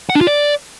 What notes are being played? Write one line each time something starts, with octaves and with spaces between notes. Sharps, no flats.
F#5
D4
F4
D5